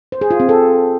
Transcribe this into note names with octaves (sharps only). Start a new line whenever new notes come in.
C5
G#4
F4
C4
A4